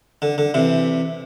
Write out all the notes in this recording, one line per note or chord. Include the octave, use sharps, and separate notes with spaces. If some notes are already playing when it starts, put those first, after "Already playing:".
D3
D3
C3 E3